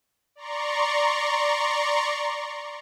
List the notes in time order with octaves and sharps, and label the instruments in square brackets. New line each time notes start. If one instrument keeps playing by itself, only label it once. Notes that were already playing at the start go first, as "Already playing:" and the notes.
[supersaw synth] D5 A#5 C6 C#6